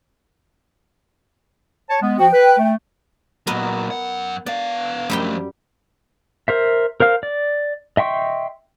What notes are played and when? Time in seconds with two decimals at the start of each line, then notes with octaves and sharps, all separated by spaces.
1.89 C#5 A5
2.01 G#3 B3
2.19 F3 F#4 G5
2.33 B4
2.58 A3
3.47 A#2 F#3 B3 A#4 D#5
3.91 F#2 F#5
4.46 B3 D5 F5
5.10 F#2 F3 G3 A3 G5
6.48 A#4 C5 E5
7.00 A#4 C5 F5 F6
7.23 D5
7.97 D#5 E5 G5 C6 C#6